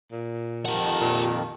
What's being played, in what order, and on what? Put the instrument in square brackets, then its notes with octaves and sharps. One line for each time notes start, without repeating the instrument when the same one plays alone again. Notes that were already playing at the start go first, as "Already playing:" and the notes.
[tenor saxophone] A#2
[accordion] F2 D#3 [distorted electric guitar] G4 F#5 [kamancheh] A#4 A5
[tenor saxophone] A#2